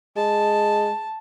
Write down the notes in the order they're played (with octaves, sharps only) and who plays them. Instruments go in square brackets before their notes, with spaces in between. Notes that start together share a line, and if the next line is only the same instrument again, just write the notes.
[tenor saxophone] G#3 [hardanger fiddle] A5